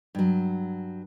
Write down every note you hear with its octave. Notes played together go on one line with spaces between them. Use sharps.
G2 F#3